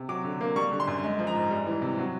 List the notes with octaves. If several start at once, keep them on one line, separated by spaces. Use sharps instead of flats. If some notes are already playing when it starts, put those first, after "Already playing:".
Already playing: C3
F#3 D6
D3
A#3
G3 C#6
D3
C6
F#2
G#3
F3
A#5
G#2
G3
E3
C3
F#3